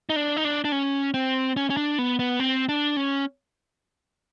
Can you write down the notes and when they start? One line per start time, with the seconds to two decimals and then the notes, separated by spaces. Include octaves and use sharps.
0.09 D#4
0.16 D4
0.37 D#4
0.45 D4
0.65 D4
0.72 C#4
1.14 C4
1.57 C#4
1.70 C#4
1.77 D4
1.99 B3
2.19 B3
2.40 C4
2.69 D4
2.97 C#4